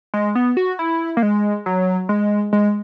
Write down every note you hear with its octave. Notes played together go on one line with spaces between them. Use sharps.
G#3
B3
F#4
E4
A#3
G#3
F#3
G#3
G#3